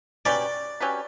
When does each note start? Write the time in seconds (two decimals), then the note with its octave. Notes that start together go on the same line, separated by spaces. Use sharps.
0.25 F#3 C#4 G4 B4 D5
0.80 F#3 C#4 G4 B4